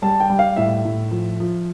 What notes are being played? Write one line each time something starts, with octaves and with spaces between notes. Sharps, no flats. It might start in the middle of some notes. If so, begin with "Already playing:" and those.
G3 A5
G5
G3
F5
A2 E5
A2
F3
F3